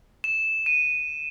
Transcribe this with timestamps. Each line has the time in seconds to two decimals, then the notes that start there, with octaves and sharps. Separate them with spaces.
0.24 E7
0.66 D#7